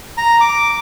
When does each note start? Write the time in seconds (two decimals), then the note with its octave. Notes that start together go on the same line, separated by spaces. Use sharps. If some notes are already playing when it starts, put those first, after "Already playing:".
0.17 A#5
0.41 D6